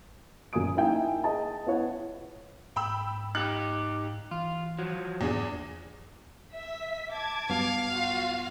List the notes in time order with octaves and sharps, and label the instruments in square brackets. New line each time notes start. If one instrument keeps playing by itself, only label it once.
[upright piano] F#1 F#2 A#2 G#5 D#6 D7
A#3 D#4 E4 E5 G5 G#5
G#4 D#5 A5
B3 E4 C#5 F#5
[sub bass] G#2 [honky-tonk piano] G5 B5 E6
[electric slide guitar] D#4 G4 [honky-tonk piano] F#6
[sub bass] E3 [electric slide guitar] F4
[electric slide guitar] F3 F#3
[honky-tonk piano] E2 D4 G#4 [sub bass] G#2
[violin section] E5 B6
A5 D6 G#6
[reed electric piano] G2 F#3 B3 [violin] F5
[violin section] F4 F#4